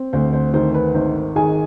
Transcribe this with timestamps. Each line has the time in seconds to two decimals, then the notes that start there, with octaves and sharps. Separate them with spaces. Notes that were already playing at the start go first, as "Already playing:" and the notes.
Already playing: C4
0.13 D2 C5
0.33 C5
0.54 D#3 C5
0.74 B4
0.94 G#1 C5
1.36 D#3 G#4 G#5